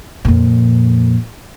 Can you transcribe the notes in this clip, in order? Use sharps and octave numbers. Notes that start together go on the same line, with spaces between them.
F2 A#2